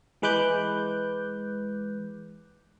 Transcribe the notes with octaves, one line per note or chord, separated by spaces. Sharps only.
E3 G#3 B4 D6 F#6 G6